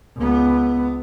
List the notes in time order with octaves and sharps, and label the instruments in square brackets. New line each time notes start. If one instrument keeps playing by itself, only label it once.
[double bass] C#2 B3